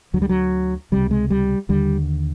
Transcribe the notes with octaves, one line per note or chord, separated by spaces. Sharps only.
D2 D3 F#3
G3
F#3
C#2 C3 G3
G#3
G3
D#2 D3 G3